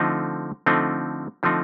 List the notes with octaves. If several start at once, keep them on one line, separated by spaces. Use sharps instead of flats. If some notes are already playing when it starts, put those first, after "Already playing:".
Already playing: D3 F3 A3 C4 D#4
D3 F3 A3 C4 D#4
D3 F3 A3 C4 D#4